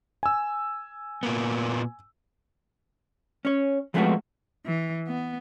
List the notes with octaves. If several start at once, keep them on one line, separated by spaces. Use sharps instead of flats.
G#5 E6
A#2 A#3 B3
C#4 C#5
F3 G#3 A3 B3 C4 F#4
E3
B3